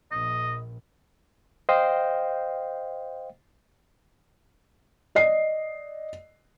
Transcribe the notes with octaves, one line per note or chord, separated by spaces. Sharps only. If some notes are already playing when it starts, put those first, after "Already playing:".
A#1 D#5
C5 D#5 F5 G5
D5 D#5 C7